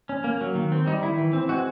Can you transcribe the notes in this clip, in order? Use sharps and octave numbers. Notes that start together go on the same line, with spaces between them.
C#4
A#3
F#3
D#3
C4
G3 D#4
D#3 E4
E3
C4
G#3 F#4